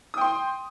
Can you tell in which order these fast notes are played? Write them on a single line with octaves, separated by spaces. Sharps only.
D#6 G5 C6